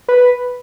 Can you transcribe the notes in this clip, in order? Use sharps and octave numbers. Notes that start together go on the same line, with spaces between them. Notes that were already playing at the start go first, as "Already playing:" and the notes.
B4